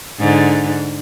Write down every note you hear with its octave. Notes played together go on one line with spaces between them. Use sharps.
G#2 D3